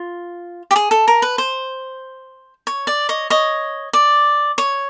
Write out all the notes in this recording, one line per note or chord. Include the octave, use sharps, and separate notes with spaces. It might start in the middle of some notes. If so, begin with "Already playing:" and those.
Already playing: F4
G4
G#4
A4
A#4
B4
C5
C#5
D5
C#5 D#5
C#5 D#5
D5
C#5